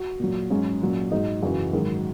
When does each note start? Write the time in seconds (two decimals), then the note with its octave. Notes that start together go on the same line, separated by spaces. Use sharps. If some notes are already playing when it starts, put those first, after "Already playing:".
Already playing: F#4
0.20 A#2 F#3
0.50 G#2 F#3 C#4
0.82 A#2 F#3
1.11 G#2 F#3 D#4
1.42 F#2 C#3 E3 F#4
1.73 G#2 D#3 F#3